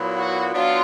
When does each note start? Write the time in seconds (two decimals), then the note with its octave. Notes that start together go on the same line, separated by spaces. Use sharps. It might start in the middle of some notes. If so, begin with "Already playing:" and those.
Already playing: A#2 F#3 B3 E4
0.17 F#4
0.53 F#3 B3 D4 F4